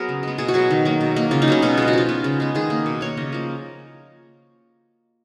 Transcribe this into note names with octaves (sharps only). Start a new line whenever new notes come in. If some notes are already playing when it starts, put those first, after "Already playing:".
Already playing: F#3 B3 F#4 G#4 A#4
C#3
G#3 B3
B2 G#4
F#4
F#3 B3 G#4
D#3
F#3 A#3
B2
A#3
C#3 F4
D#4
F#3 B3 C#4
B2 C#4
G#3 B3 F4
F#4
F3 F4
B3
C#3
G#3 B3
D#3 G#4
A#3
B2
A#3 C#5
C#3 D#5
F3 A#3